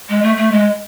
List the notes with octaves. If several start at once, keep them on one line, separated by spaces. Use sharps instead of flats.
G#3
A3
A3
G#3